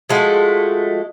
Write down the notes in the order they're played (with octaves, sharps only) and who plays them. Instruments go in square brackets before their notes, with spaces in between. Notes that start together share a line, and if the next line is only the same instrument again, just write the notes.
[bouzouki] F3 G#3 A3 F#4